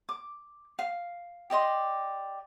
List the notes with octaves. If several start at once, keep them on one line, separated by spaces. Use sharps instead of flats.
D6
F5
G4 D5 D#5 C6